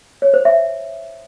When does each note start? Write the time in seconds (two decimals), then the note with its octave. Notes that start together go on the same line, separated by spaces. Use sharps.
0.22 C#5
0.34 C5
0.45 E5